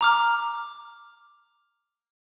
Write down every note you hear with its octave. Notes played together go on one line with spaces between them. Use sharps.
A#5 D6 F6